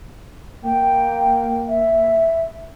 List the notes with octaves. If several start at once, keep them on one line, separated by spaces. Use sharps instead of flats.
A#3 G5
E5